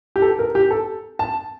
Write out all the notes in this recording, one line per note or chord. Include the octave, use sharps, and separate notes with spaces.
G4
A4
A#4
G4
A4
A5